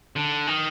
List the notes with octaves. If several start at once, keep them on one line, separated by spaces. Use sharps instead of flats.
D3
D#3